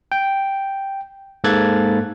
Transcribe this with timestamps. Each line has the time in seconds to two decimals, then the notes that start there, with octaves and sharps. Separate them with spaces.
0.12 G5
1.44 G#2 A#3 A4 F#6 G#6 A6